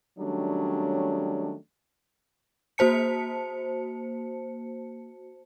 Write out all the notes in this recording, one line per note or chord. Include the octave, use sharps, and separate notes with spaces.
D#3 F#3 G3 A3 C#4 D4
A#3 F#4 C5 A5 C#7